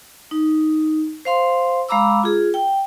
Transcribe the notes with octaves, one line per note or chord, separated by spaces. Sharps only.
D#4
C5 F5 C6
G#3 F5 A#5 B5 D6 E6
F4 G#4
G5